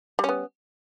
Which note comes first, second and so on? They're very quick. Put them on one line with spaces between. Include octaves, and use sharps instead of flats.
G3 C#4 B3